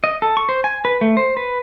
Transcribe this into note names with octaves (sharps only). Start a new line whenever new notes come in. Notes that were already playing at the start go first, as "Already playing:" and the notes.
D#5
A4
C#6
C5
G#5
B4
A3
C5
B4